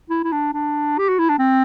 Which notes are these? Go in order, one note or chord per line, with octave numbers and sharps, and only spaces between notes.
E4
E4
D4
D4
G4
F#4
E4
D4
C4